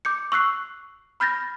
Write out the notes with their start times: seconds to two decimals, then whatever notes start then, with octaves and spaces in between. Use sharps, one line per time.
0.05 D6 G6 C#7
0.32 C#6 E6 F#6 C7
1.20 B5 F6 G6 A6 A#6